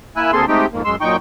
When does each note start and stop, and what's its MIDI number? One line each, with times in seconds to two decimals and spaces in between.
0.16 0.31 58
0.16 0.31 64
0.16 0.31 80
0.16 0.31 88
0.16 0.31 90
0.33 0.45 38
0.33 0.45 58
0.33 0.45 60
0.33 0.45 68
0.33 0.45 69
0.33 0.45 84
0.48 0.66 56
0.48 0.66 57
0.48 0.66 60
0.48 0.66 63
0.48 0.66 67
0.48 0.66 79
0.72 0.82 41
0.72 0.82 44
0.72 0.82 58
0.85 0.96 42
0.85 0.96 56
0.85 0.96 84
0.85 0.96 88
1.01 1.16 42
1.01 1.16 46
1.01 1.16 63
1.01 1.16 79
1.01 1.16 85
1.01 1.16 91